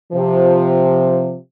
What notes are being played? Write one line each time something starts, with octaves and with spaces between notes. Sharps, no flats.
C3 F3